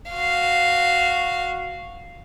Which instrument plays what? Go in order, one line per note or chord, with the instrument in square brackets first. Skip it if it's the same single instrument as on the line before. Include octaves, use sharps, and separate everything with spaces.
[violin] F#4 F5